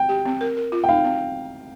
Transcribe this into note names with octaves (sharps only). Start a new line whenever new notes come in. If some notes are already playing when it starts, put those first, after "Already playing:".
Already playing: G5
G4
C4
A#4
A#4
F4
G5
D#4 F5
C4